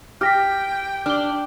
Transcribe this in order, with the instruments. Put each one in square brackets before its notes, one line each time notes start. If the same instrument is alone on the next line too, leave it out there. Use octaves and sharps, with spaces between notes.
[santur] G4 [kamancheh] G5 [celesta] F6 A#6 B6
[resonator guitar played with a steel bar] D4 [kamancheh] G4 D5 [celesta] F6 G7